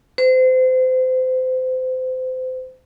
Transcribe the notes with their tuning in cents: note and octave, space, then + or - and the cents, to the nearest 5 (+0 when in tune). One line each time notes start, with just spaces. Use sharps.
C5 -30